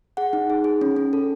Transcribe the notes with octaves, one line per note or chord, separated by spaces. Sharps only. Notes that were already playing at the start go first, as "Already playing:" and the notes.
G#4 F#5
D#4
G#4
G#4
C#4
C#4
A4